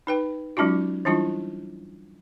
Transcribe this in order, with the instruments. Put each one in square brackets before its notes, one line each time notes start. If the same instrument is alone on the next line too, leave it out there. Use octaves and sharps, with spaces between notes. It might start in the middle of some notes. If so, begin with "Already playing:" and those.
[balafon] D#4 B4 G5
F#3 G#3 C#4 D#4 F4 F#4
E3 G3 D4 E4 F4